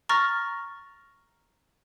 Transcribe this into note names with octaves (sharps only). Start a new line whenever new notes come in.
A#5 C#6 F6 A6 A#6